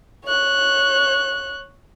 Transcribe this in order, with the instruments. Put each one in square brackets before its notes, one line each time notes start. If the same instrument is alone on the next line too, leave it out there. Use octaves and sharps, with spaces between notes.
[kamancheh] C#5 F#6